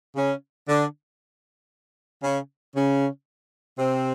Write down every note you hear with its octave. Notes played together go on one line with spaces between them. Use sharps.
C#3 C#4
D3 D4
C#3 C#4
C#3 C#4
C3 C4